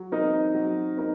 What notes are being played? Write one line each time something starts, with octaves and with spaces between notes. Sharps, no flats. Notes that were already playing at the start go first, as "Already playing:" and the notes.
Already playing: F#3
C4 D#4 A#4 D#5
F#3
C4 D#4 A#4 D#5